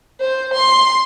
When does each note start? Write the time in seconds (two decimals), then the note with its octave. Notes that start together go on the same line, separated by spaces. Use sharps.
0.20 C5
0.53 C6